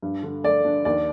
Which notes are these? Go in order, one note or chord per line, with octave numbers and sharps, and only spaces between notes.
G2
D3
A3 D5
D4
D#2 D5